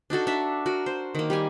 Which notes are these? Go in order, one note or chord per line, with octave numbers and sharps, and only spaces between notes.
D4 D#4 F#4 A4
D4 E5
F#4 A#4
C5
D#3 A#3
G3 G4 G#5